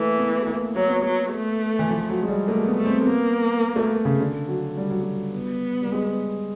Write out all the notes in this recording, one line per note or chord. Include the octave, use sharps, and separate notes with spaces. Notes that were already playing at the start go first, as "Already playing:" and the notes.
Already playing: E3 A3 A#3
B3
A3
A#3
F#3 A#3
B3
F#3 A#3
A3
E3
F3
F#3
G#3
G3
A3 A#3
B3
A3
C4
A#3 B3
A3
C#3
D3
F#3
G3
F#3
G3
B3
G3
G#3